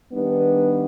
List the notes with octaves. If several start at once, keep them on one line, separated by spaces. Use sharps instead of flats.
D#3 G3 B3 D4